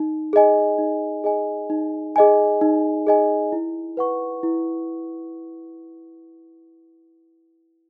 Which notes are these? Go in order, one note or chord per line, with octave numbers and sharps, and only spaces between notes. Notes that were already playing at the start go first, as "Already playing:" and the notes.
Already playing: D#4
G#4 D#5 G#5
D#4
G#4 D#5 G#5
D#4
G#4 D#5 G#5
D#4
G#4 D#5 G#5
E4
B4 F#5 C#6
E4